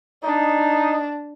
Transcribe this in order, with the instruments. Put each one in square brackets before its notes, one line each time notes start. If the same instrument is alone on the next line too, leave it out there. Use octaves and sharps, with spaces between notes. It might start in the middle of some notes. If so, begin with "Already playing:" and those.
[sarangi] D4 [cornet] D#4